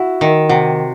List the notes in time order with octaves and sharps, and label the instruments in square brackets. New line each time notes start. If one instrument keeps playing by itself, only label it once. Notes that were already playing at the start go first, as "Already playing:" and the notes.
Already playing: [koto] E4 [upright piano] F#4 F#5
[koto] D#3
[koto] C3 [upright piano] F#4 F#5